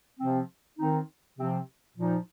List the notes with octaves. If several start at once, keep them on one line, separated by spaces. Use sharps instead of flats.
C3 F3 C4
D#3 C4 D#4
C3 F3 C4
A#2 F3 D#4